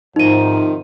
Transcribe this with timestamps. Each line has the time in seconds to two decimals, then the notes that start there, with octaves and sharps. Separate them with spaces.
0.16 G#2 C3 D#3 F3 D#4 D#7